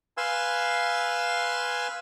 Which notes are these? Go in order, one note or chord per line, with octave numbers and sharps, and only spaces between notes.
B4 F5 G#5 C6 E6